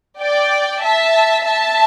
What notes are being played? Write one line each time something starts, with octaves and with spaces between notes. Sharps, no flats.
D5 G5
E5 A5
E5 A5